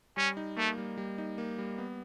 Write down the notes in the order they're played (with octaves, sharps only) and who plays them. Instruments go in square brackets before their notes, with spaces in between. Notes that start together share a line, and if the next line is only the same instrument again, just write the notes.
[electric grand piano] G3 [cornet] C#4
[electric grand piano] D#4
[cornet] A3 [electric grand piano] A#3
[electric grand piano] G3
G3
D#4
A#3
G3
B3